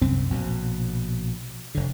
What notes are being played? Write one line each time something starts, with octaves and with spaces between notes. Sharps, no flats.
C2 F#2 C4
A#1 B2
F1 D3